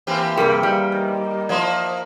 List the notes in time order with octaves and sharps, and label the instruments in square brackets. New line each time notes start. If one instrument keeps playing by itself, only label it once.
[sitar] E3 C4 G4 [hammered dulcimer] A#3
[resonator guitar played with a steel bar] G2 C3 G3 [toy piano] G#4 A#4
[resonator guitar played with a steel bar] G3 [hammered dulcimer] D#4 F5
[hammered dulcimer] D#3
[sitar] F3 A#3 E4 [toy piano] D5 C6